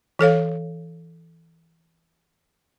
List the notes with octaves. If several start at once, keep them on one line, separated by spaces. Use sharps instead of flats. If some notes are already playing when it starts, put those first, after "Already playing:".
E3 A4 C#5 F5